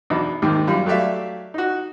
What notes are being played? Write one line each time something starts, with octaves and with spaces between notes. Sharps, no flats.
E2 B2 D4 D#4
D#2 G#2 C3 D#3
F#2 G3 F4
F#3 A3 G4 D5 E5 F5
D#4 F#4